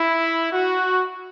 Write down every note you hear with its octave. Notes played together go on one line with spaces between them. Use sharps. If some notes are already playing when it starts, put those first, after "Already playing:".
Already playing: E4
F#4